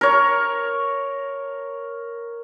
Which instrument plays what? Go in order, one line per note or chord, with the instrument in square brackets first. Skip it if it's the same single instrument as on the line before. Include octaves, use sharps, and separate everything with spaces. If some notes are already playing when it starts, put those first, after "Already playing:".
[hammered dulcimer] A#4 C#5